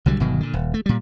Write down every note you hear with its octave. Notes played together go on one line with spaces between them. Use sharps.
C2 D3 F#3 G3
G1 B2 D#3 F#3
A#2 D3
D#1
A3
A#2 G3